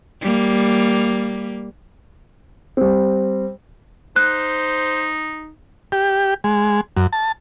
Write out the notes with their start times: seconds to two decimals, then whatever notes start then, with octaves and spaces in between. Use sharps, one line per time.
0.21 G3 A#3
2.77 G3 C4
4.16 D#4 C5 F#6
5.92 G4
6.44 G#3
6.96 F#2
7.13 A5